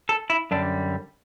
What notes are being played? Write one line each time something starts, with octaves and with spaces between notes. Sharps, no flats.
A4
E4
F#2 D3 G3 D4